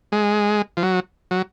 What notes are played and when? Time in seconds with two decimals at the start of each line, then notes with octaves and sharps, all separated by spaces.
0.12 G#3
0.77 F3
0.83 F#3
1.31 F#3